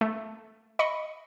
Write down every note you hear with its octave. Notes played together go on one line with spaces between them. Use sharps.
A3
D#5 B5 C#6 C#7